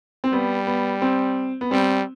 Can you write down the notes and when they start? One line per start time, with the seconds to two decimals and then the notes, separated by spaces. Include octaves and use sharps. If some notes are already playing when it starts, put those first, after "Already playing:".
0.24 C4
0.33 G3 B3
0.67 B3
1.02 C4
1.61 B3
1.71 G3 C4